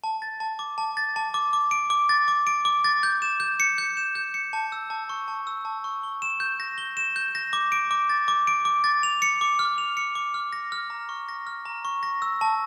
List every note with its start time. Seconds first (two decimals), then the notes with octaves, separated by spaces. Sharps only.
0.04 A5
0.22 A6
0.40 A5
0.59 D6
0.78 A5
0.97 A6
1.16 A5
1.34 D6
1.53 D6
1.71 D7
1.90 D6
2.09 A6
2.28 D6
2.47 D7
2.65 D6
2.84 A6
3.03 G6
3.22 E7
3.40 G6
3.60 C#7
3.78 G6
3.97 E7
4.15 G6
4.34 C#7
4.53 A5
4.72 E6
4.90 A5
5.09 C#6
5.28 A5
5.47 E6
5.65 A5
5.84 C#6
6.03 G7
6.22 E7
6.40 G6
6.60 A#6
6.78 G7
6.97 E7
7.16 G6
7.35 A#6
7.53 D6
7.72 D7
7.91 D6
8.09 A6
8.28 D6
8.47 D7
8.65 D6
8.84 A6
9.03 F7
9.22 C#7
9.41 D6
9.59 F6
9.78 F7
9.97 C#7
10.15 D6
10.34 F6
10.53 A#6
10.72 F6
10.90 A#5
11.09 C#6
11.29 A#6
11.47 F6
11.66 A#5
11.85 C#6
12.03 A#6
12.22 E6
12.41 A5